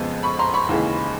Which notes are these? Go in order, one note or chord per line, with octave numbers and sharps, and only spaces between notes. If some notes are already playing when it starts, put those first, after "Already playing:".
Already playing: F2 C#3 F3 G#3 B3
B5 C#6
A#5 C6
B5 C#6
D#2 C#3 E3 G#3